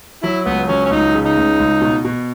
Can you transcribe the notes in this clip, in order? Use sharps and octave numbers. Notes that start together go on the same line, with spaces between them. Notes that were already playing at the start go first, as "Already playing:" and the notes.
F#3 E4
C#2 B3
F#3 C#4
C#4
C#2 D#4
C#3
D#4
C#2
C#2
B2
B2